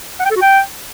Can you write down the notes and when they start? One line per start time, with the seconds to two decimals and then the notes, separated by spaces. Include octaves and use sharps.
0.20 F#5
0.25 G5
0.31 A4
0.36 F#4
0.42 G5